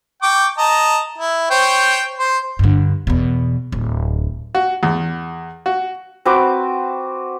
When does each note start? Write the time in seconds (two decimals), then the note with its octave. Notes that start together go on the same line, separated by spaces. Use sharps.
0.22 G5 C#6 D6
0.58 D#5 A5 A#5
1.18 E4
1.50 C5 C#5 G5
2.19 C5 C6
2.59 G2 D3
3.07 E2 B2
3.72 D1
4.55 F#4
4.83 E2
5.66 F#4
6.25 C4 F#4 B4 D6